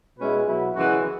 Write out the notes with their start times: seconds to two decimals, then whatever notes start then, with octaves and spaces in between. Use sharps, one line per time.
0.18 B2 G#3 C#4 E4 B4
0.46 B2 F#3 E4
0.74 F#2 C#3 E3 G#3 F#4